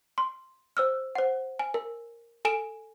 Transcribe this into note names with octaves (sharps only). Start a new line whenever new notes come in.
C6
C5 E6 F6
C5 F#5
G#5
A#4
A4 G#5 D7 E7